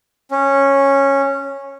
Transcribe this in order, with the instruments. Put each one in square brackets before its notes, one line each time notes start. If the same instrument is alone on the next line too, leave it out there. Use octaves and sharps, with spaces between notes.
[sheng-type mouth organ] C#4